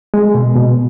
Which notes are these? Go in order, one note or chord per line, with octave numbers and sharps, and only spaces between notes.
G#3
B2
B2